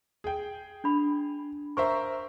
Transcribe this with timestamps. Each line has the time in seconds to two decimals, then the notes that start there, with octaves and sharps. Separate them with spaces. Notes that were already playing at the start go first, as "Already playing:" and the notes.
0.24 G#4 G5
0.84 D4 B5
1.77 A#4 C5 E5 C#6